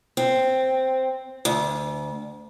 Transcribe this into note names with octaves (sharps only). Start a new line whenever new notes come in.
C4
D2